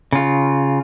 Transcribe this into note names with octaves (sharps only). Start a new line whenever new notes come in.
C#3 F4